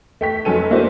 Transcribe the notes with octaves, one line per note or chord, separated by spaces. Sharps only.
A3 G5 B6
F1 F#3 C#4 A4 D#7
A3 A#3 D4 E4 F#4 C5